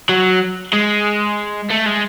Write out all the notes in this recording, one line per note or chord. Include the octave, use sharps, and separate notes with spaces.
F#3
G#3
A3
G#3